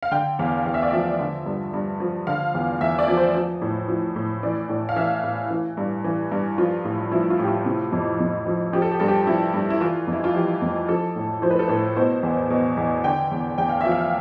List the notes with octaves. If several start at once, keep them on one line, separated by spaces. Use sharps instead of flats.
F5
D3 G5
E2 F5
E2 F5
E5
D5
F3 E5
D3
G2
G2
F3
D3 F5
E2
E2 E5
D5
F3
C5
F3
A2
F3
A2
E3 D5
A2
F5
E3 E5
A2
E3
G2
E3
G2
F3 F4
A2
F3 E4
F4
A2 G4
F4
C3
F2
F2
F3
F3 G4
A4
G4
G2 A4
G4
F3 E4
G2
E4
E3 F4
F2
E4
F4
E3 G4
F2
F3 A4
A2
F3 C5
B4
A4
A2 B4
B2 C5
E2
B2
E2
D3 G5
E2
E2 G5
F5
F3 E5
F5